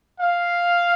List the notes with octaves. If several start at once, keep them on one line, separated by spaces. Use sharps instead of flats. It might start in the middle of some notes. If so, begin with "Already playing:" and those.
F5